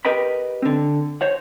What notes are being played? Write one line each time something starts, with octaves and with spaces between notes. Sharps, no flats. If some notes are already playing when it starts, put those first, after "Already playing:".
G4 A#4 B4 D#5 G5 B5
D3 C4
C5 C#5 F#5